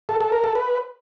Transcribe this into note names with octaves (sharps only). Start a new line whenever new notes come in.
A4
A4
A#4
A4
B4